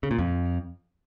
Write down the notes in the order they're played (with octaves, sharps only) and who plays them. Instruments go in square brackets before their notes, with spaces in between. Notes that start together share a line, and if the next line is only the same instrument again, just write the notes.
[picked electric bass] C#3
A#2
F2